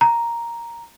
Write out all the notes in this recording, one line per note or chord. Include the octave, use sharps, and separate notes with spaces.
A#5